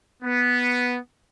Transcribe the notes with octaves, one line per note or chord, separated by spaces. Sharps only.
B3